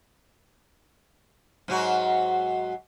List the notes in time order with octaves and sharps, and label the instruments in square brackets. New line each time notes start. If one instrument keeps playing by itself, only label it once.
[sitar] G#2 F#3 F#4